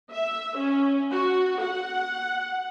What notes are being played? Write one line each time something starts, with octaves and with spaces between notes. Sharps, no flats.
E5
C#4
F#4
F#5